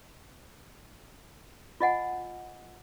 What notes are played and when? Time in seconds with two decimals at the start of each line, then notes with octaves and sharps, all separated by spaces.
1.80 F4 D#5 F#5 G#5